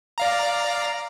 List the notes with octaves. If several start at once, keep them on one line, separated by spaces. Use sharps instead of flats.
D5 F5 A#5